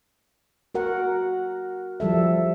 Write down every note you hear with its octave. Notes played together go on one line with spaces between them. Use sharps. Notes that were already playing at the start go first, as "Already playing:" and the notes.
F#4 A#4 F#5
F3 G3 A4 E5